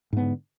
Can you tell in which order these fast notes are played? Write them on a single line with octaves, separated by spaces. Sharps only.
G#2 B3 D3